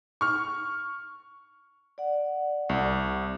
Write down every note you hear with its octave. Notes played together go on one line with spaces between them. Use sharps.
C#6 F6
D5 F#5
C2